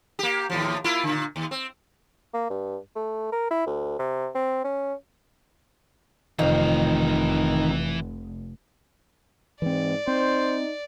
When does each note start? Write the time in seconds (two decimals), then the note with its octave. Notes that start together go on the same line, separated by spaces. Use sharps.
0.19 A#3 G4
0.50 D#2 A2 F3
0.84 A#3 E4 F4
1.04 A#2 D3
1.36 D#2
1.51 C4
2.34 A#3
2.50 G2
2.96 A3
3.32 A#4
3.51 E4
3.67 D2
3.99 C3
4.35 C4
4.64 C#4
6.39 F1 F2 D#3 E3 F5
9.62 G#2 E3 C4 D5
10.07 C4 D#4 C5